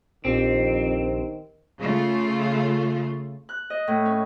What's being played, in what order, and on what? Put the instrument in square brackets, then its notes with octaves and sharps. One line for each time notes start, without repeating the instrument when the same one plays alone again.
[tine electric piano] A#1 D4 G4 [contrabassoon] F2 [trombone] D#3 [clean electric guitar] C4
[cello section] C#3 A3 F4
[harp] F#6
D#5
A2
C#4